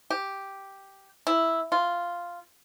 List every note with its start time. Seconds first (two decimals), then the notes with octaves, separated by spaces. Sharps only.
0.10 G4
1.27 E4
1.72 F4